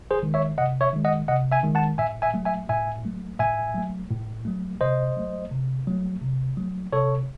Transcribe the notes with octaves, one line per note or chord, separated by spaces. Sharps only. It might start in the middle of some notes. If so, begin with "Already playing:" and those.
G#4 C5
D#3 G#3
C#5 E5
C3 D#5 F#5
C#5 E5
D#3 G#3
D#5 F#5
C3 D#5 F#5
E5 G#5
D#3 G#3
F#5 A5
A2 E5 G#5
E5 G#5
F#3 A3
E5 G#5
A2 E5 G#5
F#3 A3
A2 E5 G#5
F#3 A3
A2
F#3 A3
C3 C5 D#5
F#3 A3
C3
F#3 A3
C3
F#3 A3
C3 A4 C#5